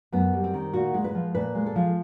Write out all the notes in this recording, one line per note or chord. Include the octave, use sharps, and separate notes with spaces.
F#2 B3
G3
C4
D#3
A#2 F#4
G#3
B4
F3
A#2 B4
G#3
A4
F3